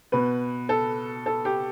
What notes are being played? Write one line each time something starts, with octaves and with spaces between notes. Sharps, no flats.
B2 B4
A4
A4
G4